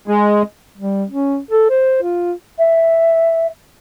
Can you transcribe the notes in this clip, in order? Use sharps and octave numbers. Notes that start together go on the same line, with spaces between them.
G#3
G3
C#4
A4
C5
F4
E5